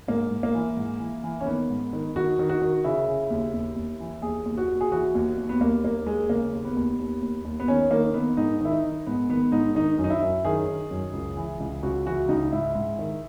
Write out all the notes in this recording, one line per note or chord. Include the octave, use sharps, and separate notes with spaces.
G#2 A#3
G#2
A#3
E3
G#2
E3
E3
C#4
D#3 B3
G#2
D#3
D#3 F#4
D#3
F#4
D#3
C#3 E4
C#3
D#2
D#2
D#2
E3
D#2 G#4
D#2
F#4
D#2
G#4
E3 F#4
D#2
D#2
B3
D#2 A#3
D#2 A#3
D#2 G#3
C#3 A#3
D#2
B3
D#2
D#2
D#2
D#2
B3
D#3 C#4
D#3 A#3
D#3 B3
G#2 D#4
D#3 E4
D#4
D#3
G#2 B3
D#3 B3
G#2 D#4
D#3 D#4
F#2
D#4
E4
F#2
D#3 G#4
D#3
F#2
C#2
E3
C#2
C#2 F#4
E3 F#4
C#2 D#4
G#2 E4
G#2
D#3